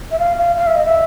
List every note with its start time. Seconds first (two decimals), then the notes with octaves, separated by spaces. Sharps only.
0.11 E5
0.19 F5
0.38 F5
0.58 F5
0.67 E5
0.76 D#5
0.86 E5